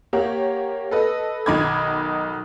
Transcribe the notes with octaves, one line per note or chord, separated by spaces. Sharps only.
A#3 G4 C#5 F#5
A4 B4 D#5
B1 D#3 D#4 B5 D6 G#6